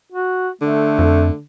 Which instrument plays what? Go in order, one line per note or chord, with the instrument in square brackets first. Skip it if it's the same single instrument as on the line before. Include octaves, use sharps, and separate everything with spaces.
[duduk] F#4
[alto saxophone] D3 [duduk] A3
[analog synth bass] F2